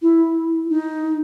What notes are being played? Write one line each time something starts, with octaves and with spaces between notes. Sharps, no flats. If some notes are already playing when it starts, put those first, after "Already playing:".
E4
D#4